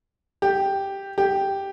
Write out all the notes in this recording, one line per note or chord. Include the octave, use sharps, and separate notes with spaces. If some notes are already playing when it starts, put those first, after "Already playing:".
G4
G4